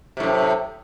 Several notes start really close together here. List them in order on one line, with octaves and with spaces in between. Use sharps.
C3 A2 F#2